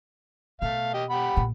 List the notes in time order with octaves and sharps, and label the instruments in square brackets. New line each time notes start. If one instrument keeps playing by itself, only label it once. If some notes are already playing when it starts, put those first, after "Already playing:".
[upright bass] B2 [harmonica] A3 F5
[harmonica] G4 D#5
G4 F#5 B5
[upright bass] A#2